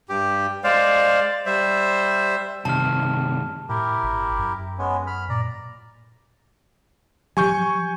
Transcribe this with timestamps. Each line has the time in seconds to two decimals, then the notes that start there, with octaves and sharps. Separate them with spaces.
0.09 G2 G4
0.64 G#3 C5 D5 F5
1.46 G3 C5 E5
2.65 G2 C3 D#3 A5 F6
3.69 A2 E4 G4 A#4
4.03 G1
4.38 F#2
4.79 G#3 B3 C#4
5.07 B5 F6
5.29 A#2 D5 A#5
7.37 F3 F#3 G4 G#5 C#6 G6